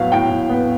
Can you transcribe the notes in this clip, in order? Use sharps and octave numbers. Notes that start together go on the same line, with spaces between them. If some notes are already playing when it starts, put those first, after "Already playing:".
Already playing: A2 F#3 B3 F5
A2 G5
A2
B3